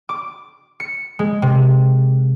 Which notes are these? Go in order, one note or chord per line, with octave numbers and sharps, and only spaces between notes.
D6
C#7
G#3
C3